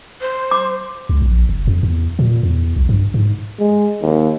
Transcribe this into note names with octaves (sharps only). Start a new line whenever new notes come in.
C5
D6
C#2
A#1
F#1
F2
E2
A#2
E2
B1
G2
G#2
G#3
D#2